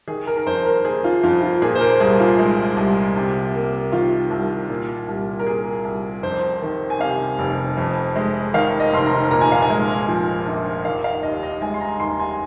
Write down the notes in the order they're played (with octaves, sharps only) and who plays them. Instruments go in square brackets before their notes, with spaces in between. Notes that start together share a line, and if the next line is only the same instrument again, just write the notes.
[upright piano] D#3 G#4
A#4
A#4
F2 C5
A#4
A#3 G#4
F4
F2 F4
F4
A#2 G#4
C5
A#4
C2 G#4
F4
G#3
C2
C3
A#3
D#3 F4
C2
A#2
C2
A#4
A#3 G#4
C2
F2 C5
D#3
G#5
C3 F5
F1
F2
G#3
D#3 F5
D#5
F1 C6
A#5
A#2 A#5
G#5
F5
G#5
G#3
F3
A#1
D#3 F5
F5
D#2 D#5
D#5
G#3 G#5
C6
A#5
D#2 C6
G#5